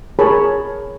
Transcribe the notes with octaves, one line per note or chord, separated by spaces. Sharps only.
G#4 A#4 C#5 A5 B5